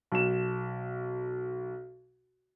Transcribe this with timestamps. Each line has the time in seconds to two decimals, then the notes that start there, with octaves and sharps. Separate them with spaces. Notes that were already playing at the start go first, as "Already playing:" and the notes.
0.12 B1 E7